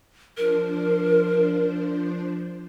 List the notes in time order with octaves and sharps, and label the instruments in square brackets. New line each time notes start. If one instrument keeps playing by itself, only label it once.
[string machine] F3 D4 C5 [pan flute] A#4